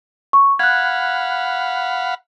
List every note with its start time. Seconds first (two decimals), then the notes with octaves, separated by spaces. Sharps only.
0.33 C#6
0.59 F5 F#5 B5 F#6 G#6